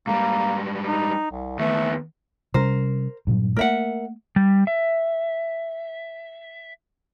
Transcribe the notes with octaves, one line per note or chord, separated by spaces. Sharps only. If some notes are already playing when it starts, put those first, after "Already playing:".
G#2 G3 A#3
D#4
C2
D#2 A3 B3
C3 G3 C#4 A#4 C5
G2 A#2 F#3
A3 A#3 A#4 E5 F#5
G3
E5